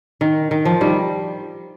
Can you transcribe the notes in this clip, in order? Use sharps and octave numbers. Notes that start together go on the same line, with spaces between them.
D#3
D#3
F3
D#3 G3